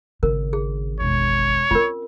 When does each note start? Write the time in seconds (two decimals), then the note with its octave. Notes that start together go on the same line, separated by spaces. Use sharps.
0.23 G#1 C#3 A#4
0.53 G#4
1.00 E1 D4 C#5
1.71 C4 C#4 F4 A#4